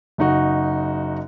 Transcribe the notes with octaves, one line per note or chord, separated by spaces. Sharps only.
F#1 D#4 F#4